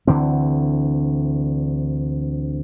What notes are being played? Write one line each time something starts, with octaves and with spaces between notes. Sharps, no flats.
D2 D3 E3 C4